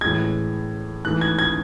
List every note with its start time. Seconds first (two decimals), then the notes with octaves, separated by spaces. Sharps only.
0.01 A2 E3 G#3 G#6
1.05 G#2 E3 A3 F#6
1.21 G#6
1.39 G#6